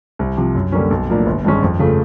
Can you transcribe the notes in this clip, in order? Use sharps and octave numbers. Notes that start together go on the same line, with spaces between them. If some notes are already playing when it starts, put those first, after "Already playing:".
C2
C3 F3
F#2
D3 G3 A#3 C#4
B1
A2 F3 A#3 D4
G1
G2 D#3 G#3 C#4
F2
C#3 F3 A3